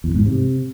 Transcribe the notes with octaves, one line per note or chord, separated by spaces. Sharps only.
E2
G#2
C3